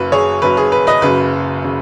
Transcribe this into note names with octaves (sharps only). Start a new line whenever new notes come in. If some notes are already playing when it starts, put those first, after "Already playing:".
Already playing: F#1 F#2 F#3 B4
G#4 C#5
F#1 F#2 F#3 B4
G#4
B4
B4 D#5
F#1 F#2 C#3 B4
C#3